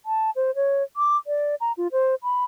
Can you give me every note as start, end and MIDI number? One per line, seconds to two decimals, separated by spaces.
0.06 0.30 81
0.36 0.54 72
0.55 0.83 73
0.97 1.17 86
1.27 1.55 74
1.61 1.72 82
1.77 1.88 65
1.92 2.15 72
2.23 2.44 83